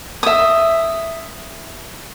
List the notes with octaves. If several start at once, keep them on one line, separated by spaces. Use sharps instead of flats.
E5 D#6